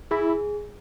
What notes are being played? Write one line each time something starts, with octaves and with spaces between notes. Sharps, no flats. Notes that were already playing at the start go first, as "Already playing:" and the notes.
E4 G#4